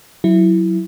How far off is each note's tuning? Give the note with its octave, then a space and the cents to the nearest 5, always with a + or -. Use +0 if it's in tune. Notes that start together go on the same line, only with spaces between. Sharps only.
F#3 +0 E4 +0